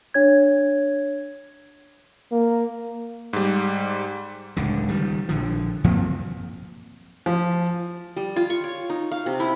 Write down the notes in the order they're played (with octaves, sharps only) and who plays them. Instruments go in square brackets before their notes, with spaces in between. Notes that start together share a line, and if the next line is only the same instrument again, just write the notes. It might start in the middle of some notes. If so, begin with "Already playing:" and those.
[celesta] D4 C#5 G#6
[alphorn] A#3
[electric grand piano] G#2 G3
[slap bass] D1 C#2 D3
D#3 G3
A#1 D3 F3
F#2 F3 A#3 C4
[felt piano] F3
[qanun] G3
F4
C#6
C#5
D#4
F5
C3
E4